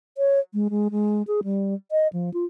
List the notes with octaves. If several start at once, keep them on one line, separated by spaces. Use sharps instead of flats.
C#5
G#3
G#3
G#3
G#4
G3
D#5
F3
F4